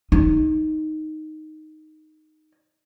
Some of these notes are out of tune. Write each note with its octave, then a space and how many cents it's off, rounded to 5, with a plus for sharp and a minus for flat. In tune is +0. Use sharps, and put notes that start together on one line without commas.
D#4 +0